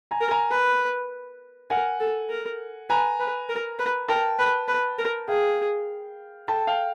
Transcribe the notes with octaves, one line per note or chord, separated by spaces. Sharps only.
G#5 A#5
A#4
G#5 A#5
B4
A#4 F#5 G#5
A4
A#4
B4 G#5 A#5
B4
A#4
B4
A#4 G5 A5
B4
B4
A#4
G#4 F5 G5
A4 G5 A5
F5 G5